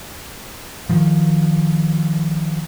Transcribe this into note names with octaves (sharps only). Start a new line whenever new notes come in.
D#3 F3